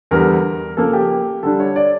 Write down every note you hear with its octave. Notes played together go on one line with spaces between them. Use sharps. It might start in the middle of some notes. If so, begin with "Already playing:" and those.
E2 D3 G3 A#4
C#3 F3 A#3 A4
G4
D3 G3 D4 A4
C#5
D5